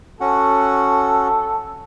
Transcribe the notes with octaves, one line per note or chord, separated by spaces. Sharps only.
C#4 F#4 A4 F#5